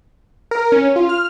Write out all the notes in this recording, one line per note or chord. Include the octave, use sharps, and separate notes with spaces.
A#4
C#4
F4
F6